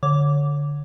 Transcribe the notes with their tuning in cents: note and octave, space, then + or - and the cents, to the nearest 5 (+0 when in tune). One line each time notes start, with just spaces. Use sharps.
D3 -10 C#5 +0 D6 -10